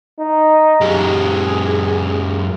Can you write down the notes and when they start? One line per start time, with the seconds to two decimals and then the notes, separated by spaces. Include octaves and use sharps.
0.19 D#4
0.82 F#2 G4 G#4